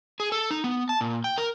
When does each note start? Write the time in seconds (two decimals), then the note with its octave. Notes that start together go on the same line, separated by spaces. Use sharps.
0.20 G#4
0.32 A4
0.51 D#4
0.64 B3
0.89 A5
1.01 A#2
1.24 G5
1.38 A#4